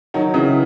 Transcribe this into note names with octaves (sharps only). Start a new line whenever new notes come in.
D#3 F#3
C#3 E3